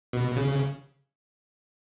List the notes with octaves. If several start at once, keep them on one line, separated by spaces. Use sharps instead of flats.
B2
C#3